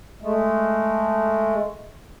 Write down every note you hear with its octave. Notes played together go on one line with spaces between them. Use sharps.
G#3 A3